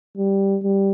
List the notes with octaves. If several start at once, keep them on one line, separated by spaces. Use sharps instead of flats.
G3
G3